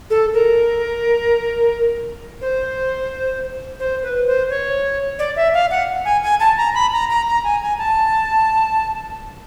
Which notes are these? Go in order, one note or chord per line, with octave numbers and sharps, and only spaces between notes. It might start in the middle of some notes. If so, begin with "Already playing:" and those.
A4
A#4
C5
C5
B4
C5
C#5
D5
E5
F5
F#5
G#5
G#5
A5
A#5
B5
A#5
A#5
A#5
G#5
G#5
A5